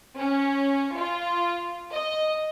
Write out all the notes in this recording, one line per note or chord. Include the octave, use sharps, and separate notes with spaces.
C#4
F4
D#5